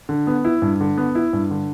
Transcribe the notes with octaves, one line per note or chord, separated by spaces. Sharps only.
D3
B3
E4
G2
D3
B3
E4
G2
D3